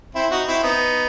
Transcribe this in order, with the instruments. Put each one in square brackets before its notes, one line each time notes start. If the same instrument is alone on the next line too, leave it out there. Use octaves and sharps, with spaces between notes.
[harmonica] C4 E4
D#4 F#4
C4 E4
B3 D#4